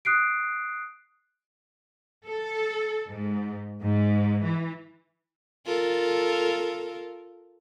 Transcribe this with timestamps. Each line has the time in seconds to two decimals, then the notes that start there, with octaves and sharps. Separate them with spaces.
0.05 D#6 F#6 C7 D7
2.25 A4
3.08 G#2
3.83 G#2
4.43 E3
5.66 F4 A4 A#4